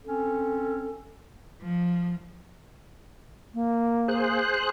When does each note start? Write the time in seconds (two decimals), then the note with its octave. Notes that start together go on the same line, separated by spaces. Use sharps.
0.05 C4 C#4 A4
1.60 F3
3.54 A#3
4.08 G#4 C5 F#6